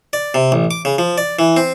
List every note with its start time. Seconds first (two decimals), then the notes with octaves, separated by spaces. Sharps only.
0.13 D5
0.34 C3
0.52 A1
0.71 D6
0.85 C#3
0.98 F3
1.18 D5
1.39 E3
1.57 C4